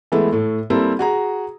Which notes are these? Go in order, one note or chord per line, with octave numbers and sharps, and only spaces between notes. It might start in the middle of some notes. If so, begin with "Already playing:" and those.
E3 G#3 A3 B3
A2 A3
G3 A#3 C4 E4 A4
F#4 G#4 A#5